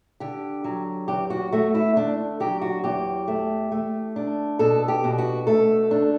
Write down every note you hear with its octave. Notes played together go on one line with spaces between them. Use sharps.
D3 G4
F#3
E2 G4
F#4
A3 F#4
E4
D3 D4
F#3 G4
F#4
E2 G4
A3
A3
D4
B2 A4
G4
B2
F#4
A3 A4
D4